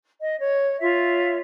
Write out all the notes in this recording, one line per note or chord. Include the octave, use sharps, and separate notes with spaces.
D#5
C#5
F4 C#5 E5